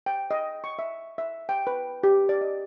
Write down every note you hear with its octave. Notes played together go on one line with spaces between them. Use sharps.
G5
D#5
C#6
E5
E5
G5
B4
G4
D5
D#5